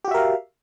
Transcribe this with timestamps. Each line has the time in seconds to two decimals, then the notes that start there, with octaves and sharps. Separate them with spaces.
0.05 G4
0.08 F#4
0.11 E5
0.14 A#4
0.18 F5